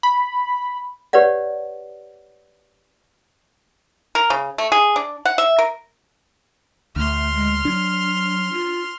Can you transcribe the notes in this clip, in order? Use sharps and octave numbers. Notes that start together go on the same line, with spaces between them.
B5
G4 B4 C#5 D5 F#5
A#4
C#3
A3
G#4
D4
F#5
E5
A#4
D2 A3 C6 F6
G#3
F#3 D4
F4